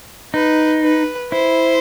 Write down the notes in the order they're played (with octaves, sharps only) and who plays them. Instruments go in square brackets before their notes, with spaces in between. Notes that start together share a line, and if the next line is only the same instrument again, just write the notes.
[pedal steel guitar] D#4 [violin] B4
[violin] B4
[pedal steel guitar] E4 [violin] C5